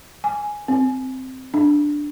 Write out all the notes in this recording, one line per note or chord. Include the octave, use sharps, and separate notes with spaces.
G#5
C4
D4